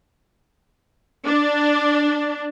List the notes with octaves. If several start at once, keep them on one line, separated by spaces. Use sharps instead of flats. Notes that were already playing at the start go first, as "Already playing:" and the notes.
D4